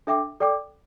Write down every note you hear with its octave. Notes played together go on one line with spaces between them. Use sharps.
D4 A4 E5 G5 D6
A4 D5 G5 D6